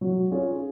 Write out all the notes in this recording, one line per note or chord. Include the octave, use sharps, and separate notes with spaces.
F#3
C#4 F4 G#4 C#5